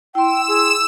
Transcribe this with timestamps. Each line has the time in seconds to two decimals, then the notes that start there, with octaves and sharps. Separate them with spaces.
0.15 E4 G5 C6 E6 E7
0.48 G#4